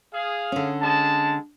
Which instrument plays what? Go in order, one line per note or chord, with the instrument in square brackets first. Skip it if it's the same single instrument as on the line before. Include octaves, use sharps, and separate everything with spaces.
[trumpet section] G#4 F5
[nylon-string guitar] D3 C#4
[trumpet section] G#3 A5